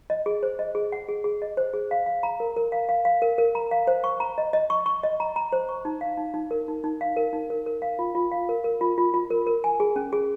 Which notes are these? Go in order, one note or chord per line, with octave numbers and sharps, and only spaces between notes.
D#5
G#4
C5
D#5
G#4
F#5
G#4
G#4
D#5
C5
G#4
F5
F5
A#5
A#4
A#4
F5
F5
F5
A#4
A#4
A#5
F5
C5
C#6
A#5
D#5
D#5
C#6
C#6
D#5
A#5
A#5
C5
C#6
D#4
F5
D#4
D#4
A#4
D#4
D#4
F5
A#4
D#4
A#4
A#4
F5
F4
F4
F5
A#4
A#4
F4
F4
F4
A#4
A#4
G#5
G#4
C#4
G#4